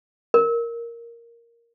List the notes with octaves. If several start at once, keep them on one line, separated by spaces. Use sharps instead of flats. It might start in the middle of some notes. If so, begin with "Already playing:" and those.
A#4